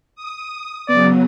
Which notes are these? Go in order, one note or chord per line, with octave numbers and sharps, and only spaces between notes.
D#6
C#3 F#3 B3 D5